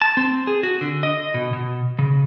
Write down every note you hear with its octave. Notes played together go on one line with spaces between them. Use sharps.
A5
C4
G#4
F#4
D3
D#5
B2
B2
C#3